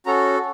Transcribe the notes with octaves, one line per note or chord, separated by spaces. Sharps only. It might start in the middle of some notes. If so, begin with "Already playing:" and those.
C#4 F#4 A4 A#5